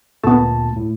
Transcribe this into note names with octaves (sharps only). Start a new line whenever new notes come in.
D2 A#2 A3 B3 A5
A2